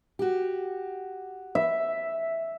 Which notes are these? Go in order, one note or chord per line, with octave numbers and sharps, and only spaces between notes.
F#4 G4
E5